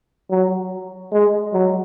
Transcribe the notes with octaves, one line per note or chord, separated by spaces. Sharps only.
F#3
G#3
F#3